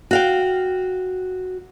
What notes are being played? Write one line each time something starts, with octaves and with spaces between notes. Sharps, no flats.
F#4 F5 G5